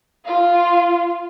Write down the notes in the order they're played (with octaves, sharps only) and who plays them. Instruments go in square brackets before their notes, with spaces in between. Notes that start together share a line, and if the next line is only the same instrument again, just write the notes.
[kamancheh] F4 F5